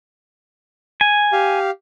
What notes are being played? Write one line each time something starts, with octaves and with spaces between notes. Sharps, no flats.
G#5
G4 F5